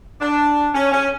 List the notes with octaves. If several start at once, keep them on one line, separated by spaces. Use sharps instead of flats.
D4
C#4
C#4